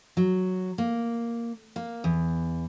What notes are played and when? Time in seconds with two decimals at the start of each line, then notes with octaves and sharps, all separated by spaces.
0.17 F#3
0.78 A#3
1.76 A#3
2.04 E2